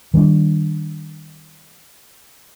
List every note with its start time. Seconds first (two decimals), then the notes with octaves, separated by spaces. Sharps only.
0.14 D#3 G3 G#3 D4